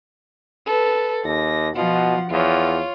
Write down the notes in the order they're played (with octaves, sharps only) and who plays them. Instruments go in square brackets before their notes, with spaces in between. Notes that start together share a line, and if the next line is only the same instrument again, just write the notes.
[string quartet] A4 B4
[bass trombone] D#2 [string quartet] A#6
[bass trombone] B2 [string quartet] F3 F4 F#5
[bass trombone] E2 [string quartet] F4 C#5